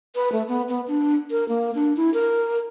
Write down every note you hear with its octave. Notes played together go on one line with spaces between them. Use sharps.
B4
A3
B3
B3
D4
A#4
A#3
D4
E4
A#4